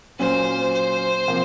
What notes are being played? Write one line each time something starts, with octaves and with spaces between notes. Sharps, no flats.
A#2 F#3 C#4 C5
C5
C3 F3 A#3